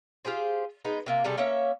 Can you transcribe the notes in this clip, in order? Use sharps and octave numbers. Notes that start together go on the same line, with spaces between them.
F4 G4 G#4 C5
G#3 B3 D#4
C3 A#3 F4
C3 G3 A3 G#4
A#3 C#4 C#5 E5